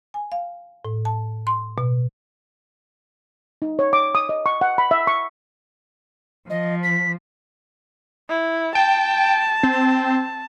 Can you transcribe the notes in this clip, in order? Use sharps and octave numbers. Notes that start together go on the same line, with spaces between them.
G#5
F5
A2
A5
C6
B2
D#4
C#5
D6
D#6
D#5
C#6
F#5
B5
E5
C#6
F3 D#5
B6
E4
G5 A5
C4